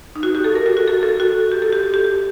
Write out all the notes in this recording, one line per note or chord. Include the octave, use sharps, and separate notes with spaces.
D#4
F#4
G4
A4
A#4
F#4
F#4
A4
A4
F#4
G4
A4
G4
G4
G4